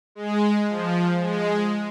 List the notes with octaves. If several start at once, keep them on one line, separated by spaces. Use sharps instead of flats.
G#3
F3
G#3